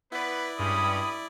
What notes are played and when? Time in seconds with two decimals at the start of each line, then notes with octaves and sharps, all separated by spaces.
0.12 B3 E4 B4 D5
0.59 G2 G#3 C#4 B5 D#6